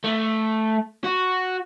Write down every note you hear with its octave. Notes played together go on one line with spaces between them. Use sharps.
A3
F#4